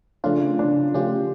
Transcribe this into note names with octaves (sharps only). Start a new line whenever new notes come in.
C#3 F3 A3 C#4 D4 F4
D4
C#3 F3 A3 C#4 F4 G4